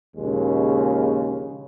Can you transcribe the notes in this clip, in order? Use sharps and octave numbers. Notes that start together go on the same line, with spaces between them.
A#1 D#2 C#3 G#3